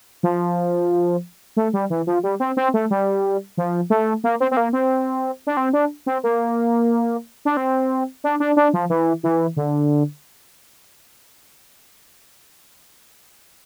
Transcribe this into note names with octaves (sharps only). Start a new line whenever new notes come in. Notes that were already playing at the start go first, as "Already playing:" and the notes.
F3
A3
G3
E3
F3
G3
C4
C4
A3
G3
F3
A3
A#3
C4
C4
A#3
C4
D4
C4
D4
C4
A#3
D4
C4
D4
D4
D4
F3
E3
E3
D3